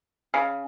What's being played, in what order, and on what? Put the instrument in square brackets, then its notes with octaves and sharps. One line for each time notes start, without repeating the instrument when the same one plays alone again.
[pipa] C#3